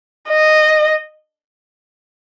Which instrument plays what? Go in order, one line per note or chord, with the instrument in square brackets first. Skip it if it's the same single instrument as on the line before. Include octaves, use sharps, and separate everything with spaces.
[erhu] D#5